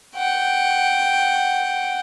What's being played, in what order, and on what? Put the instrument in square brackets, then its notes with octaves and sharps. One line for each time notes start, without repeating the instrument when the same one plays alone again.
[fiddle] F#5 G5